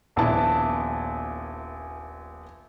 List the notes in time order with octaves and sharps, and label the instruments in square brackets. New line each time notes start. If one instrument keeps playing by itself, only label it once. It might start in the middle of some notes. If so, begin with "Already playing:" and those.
[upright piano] D#1 A#1 B3 E4 A5